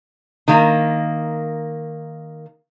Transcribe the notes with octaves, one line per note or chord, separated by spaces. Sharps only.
D#3 A#3